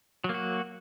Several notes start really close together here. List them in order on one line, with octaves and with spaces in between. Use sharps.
F#3 A#3 F#4